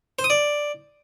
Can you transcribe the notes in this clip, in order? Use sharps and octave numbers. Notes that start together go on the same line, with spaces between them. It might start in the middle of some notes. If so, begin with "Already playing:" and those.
C5
D#6
D5